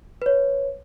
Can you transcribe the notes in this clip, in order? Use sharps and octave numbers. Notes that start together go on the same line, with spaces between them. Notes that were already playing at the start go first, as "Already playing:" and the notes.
B4 C#5